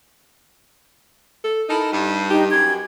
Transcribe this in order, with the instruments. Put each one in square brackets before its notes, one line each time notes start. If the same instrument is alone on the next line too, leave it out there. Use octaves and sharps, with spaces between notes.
[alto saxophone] A4
[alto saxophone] D#4 [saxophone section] E4 A4 A#4
[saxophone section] G2
[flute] D#4 [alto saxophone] G4
[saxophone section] F#2 [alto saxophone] G4 [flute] G#6